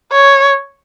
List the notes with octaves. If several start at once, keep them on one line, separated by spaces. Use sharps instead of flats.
C#5